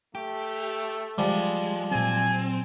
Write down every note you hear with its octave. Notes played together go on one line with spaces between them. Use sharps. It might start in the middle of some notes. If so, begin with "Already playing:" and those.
A3 G4
F3 G3 G#3
A#2 F#3 C4 G#5